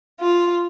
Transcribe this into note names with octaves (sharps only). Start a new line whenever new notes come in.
F4